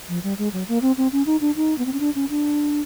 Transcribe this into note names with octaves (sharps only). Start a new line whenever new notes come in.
F3
G3
G#3
F#3
A#3
C4
C4
C#4
D#4
D4
D#4
B3
C4
C#4
D4
C#4
D4